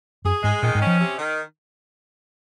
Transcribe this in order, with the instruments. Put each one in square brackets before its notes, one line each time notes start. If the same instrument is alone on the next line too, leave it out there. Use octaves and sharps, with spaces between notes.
[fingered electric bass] F#2 [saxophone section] G#4
[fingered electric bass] G#2 [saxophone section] G#3
[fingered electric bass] A#2 [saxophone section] D#3
[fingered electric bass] G#2
[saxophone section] C#4
[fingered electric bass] F3
[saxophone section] C3
D#3